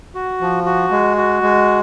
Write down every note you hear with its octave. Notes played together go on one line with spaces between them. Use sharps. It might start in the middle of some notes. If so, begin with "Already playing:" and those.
F#4
F3
F#4
G#3
F#4
G#3